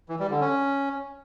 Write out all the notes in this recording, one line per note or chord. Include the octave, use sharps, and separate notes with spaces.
E3
G3
D3
C#4